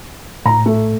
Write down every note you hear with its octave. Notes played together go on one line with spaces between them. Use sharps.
A2 A#5
A3